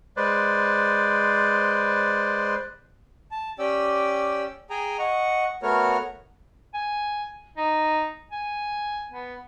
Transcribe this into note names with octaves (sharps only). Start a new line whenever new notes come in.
G#3 B4 C5 D5
A5
C#4 G4 D5 G5 E6
G#4 G5 G#5 A#5
D#5 F#5 C#6
A3 B3 F#4 A#4 C#5 F6
G#5
D#4
G#5
B3